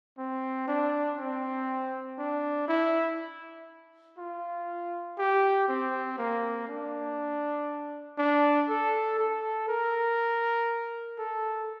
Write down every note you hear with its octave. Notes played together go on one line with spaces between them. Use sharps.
C4
D4
C4
D4
E4
F4
G4
C4
A#3
D4
D4
A4
A4
A#4
A4